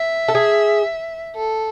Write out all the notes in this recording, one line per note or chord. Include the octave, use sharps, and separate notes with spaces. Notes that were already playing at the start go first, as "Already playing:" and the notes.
Already playing: E5
A4
G#4
A4